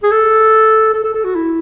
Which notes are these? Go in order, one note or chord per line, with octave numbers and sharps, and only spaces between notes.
G#4
A4
A4
A4
A4
F#4
E4